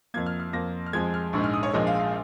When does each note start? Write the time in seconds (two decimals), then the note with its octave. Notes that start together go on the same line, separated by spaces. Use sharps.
0.14 F2 F3 A#3 G#6
0.26 F6
0.40 F6
0.53 F2 F3 A#3 A#6
0.86 F6
0.93 F2 F3 G#3 G#6
1.14 F6
1.33 A#1 G#2 G#3 C#6
1.44 F6
1.53 D#6
1.63 C#5
1.73 A#1 A#2 F3 G#3 D#5
1.87 F5
2.00 F5